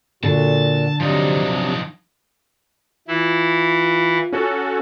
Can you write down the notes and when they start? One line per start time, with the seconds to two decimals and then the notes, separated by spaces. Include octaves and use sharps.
0.23 A#2 D3 F#4 A5
1.00 C3 F3 F#3 D4 D#4
3.08 E3 E4 F4
4.32 C#4 F#4 A4